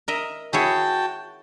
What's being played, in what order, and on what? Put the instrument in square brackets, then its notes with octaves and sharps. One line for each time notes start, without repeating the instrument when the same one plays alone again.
[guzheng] A#4 D#5 E5
[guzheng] E4 G#4 C#5 [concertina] F#4 G5 A5